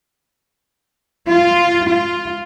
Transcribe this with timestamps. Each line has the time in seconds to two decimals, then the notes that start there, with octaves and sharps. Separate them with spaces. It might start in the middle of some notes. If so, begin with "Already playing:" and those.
1.29 F4
1.90 F4